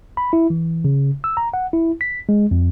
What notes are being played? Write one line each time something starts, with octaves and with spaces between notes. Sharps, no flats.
B5
E4
E3
C#3
E6
A#5
F#5
E4
B6
G#3
F2